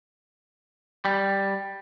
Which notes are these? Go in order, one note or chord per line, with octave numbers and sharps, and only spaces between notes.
G3